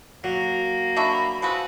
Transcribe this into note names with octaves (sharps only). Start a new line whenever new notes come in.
F#3 A#3
D4 F#4 E5 B5
F3 G#3 F#4 B4 E6